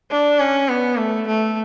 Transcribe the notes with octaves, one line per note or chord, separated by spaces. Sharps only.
D4
C#4
B3
A3
A3